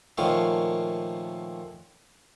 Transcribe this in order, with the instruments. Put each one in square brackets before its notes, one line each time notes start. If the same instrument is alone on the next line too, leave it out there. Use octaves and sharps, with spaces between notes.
[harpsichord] A#2 D#3 F3 A3 C#5 F5